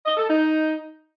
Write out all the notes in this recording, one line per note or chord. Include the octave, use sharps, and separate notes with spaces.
D#5
A4
D#4